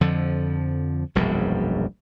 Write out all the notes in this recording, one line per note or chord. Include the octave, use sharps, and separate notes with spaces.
F2 D3 F3
E1 A#1 F#2 G3